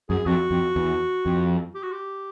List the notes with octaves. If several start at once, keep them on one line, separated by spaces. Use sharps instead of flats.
F#2 G#4
F2 F#4
F2
E2
F2
G4
F#4
G4